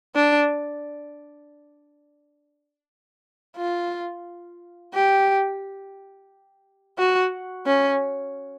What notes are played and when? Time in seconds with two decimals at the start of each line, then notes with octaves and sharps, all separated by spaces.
0.15 D4
3.57 F4
4.93 G4
6.98 F#4
7.66 C#4